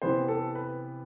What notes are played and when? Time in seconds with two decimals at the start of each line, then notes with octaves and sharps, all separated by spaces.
0.02 C3 E3 B3 C5
0.28 A4
0.55 B4